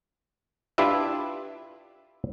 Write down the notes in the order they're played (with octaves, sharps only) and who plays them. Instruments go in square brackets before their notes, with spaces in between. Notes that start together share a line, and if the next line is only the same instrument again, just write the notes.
[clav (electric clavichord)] D4 E4 F4 G4 B4 E5